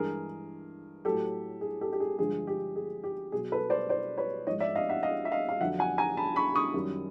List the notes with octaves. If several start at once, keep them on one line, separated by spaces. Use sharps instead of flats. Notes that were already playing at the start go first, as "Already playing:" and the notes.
Already playing: G2 E3 G#3 G#4 A#4
A2 F#3 G4 A4
G#4
G4 A4
G4
G#4
G2 D3 F3 G#3 G#4
G4
G#4
G4
B2 F#3 G#4
A4 B4
C5 D5
C5 D5
B4 C#5
G#2 F3 G#3 C#5 D#5
D5 E5
D#5 F5
E5 F#5
D#5 F5
E5
D#5 F5
F5
F2 D3 F#3 E5 F#5
F#5 G#5
G#5 A#5
A5 B5
B5 C#6
C#6 D#6
F#2 D#3 G3